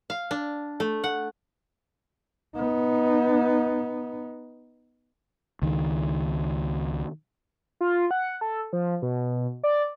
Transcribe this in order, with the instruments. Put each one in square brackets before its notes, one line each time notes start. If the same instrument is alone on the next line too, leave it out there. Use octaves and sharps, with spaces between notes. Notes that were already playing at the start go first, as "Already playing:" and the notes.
[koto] F5
D4
A3
F#5
[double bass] B3 D#4
[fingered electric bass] C#2 D#3
[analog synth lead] F4
F#5
A4
F3
B2
D5